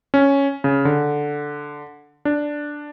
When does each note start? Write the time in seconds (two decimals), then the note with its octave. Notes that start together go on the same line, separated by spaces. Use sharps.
0.14 C#4
0.64 C#3
0.85 D3
2.25 D4